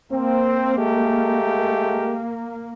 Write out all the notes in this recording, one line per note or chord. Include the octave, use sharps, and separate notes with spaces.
A#3 C4
G#3 A3 G4